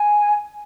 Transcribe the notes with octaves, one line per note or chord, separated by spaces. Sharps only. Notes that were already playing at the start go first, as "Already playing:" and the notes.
Already playing: G#5